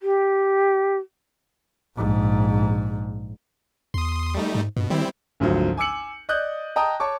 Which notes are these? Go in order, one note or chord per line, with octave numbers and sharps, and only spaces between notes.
G4
A#1 G#2
E2 C6 D#6
G3 A3 D#4
G#2
G2 B2
D#3 G3 C4 E4
G#1 D2 F3 F#3
G#5 D6 E6 C#7 F#7
D5 D#5 D#6 F#6 G6
D#5 G5 A5 A#5 D#6
C#5 A5 C#6 D6